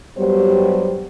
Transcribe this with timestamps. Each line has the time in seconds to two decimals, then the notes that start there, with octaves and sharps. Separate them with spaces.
0.17 G2 F#3 G3 B3 G4 C5